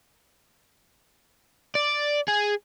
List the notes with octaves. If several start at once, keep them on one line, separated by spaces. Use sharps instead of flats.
D5
G#4